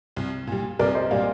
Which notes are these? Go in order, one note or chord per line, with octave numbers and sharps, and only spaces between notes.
C2
A#2 G3
C2 A#4 D5
C5 D#5
A#2 G3 D5 F5